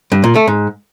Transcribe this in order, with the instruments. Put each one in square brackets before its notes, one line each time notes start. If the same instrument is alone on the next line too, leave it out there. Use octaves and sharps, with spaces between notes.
[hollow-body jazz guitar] G2
A#2
A3
G#2